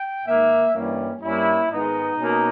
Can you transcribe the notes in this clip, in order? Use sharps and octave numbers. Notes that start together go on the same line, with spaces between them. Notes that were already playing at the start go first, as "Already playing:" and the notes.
Already playing: G5
G#2 D#3 A#3 E5
G2 E3 G3 A#3 C#4
G2 G3 A#3 C#4 E4
G#2 D#3 G#3 B3 D#4
B2 A#3 C#4